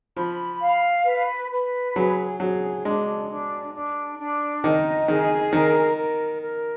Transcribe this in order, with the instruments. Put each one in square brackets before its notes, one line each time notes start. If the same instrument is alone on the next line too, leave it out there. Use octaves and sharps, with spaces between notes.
[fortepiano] F3 [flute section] B5
[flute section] F5
B4
B4
[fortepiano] F#3 [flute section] G#4
[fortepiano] F#3 [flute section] G#4
[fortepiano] G#3 [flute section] D4
[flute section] D4
D4
D4
[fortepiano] D#3 [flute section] D#4
[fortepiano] D#3 [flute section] G#4
[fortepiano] D#3 [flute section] A#4
[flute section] A#4
A#4